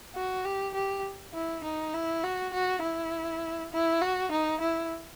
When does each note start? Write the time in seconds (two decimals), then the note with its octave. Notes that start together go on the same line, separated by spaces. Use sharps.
0.15 F#4
0.45 G4
0.74 G4
1.34 E4
1.64 D#4
1.94 E4
2.23 F#4
2.53 F#4
2.82 E4
3.73 E4
4.01 F#4
4.32 D#4
4.61 E4